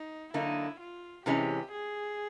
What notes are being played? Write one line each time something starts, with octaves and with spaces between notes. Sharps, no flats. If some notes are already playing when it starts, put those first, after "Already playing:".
Already playing: D#4
D3 F#3 A#3 D#4 E4
F4
C3 E3 G#3 C#4 G4
G#4